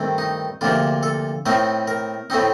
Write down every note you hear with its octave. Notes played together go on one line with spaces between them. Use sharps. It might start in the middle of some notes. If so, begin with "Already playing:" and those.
Already playing: G2 D#3 A3 C4
D#4
D2 C3 F3 A#3 F4
A4
A2 A3 C4 D#4 A#4
A#4
A2 A3 C4 D#4